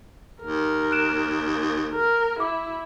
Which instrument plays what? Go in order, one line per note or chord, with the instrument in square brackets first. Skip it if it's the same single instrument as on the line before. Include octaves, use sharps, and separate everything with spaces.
[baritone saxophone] D#2 [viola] A#4
[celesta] F#6 D7 E7
[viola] A#4
[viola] E4 [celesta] D6